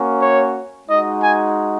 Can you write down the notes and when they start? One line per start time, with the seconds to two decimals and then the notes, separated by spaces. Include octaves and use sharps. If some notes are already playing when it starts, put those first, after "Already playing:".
Already playing: A#3 C#4 F#4
0.21 C#5
0.88 G#3 D#4 F#4 D#5
1.21 G#5